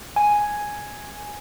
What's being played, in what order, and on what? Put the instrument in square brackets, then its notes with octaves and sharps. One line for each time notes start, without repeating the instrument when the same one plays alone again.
[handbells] G#5